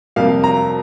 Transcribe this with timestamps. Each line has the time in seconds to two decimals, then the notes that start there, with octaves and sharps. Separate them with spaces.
0.16 F2 C3 G3 A#3 F5
0.44 A#5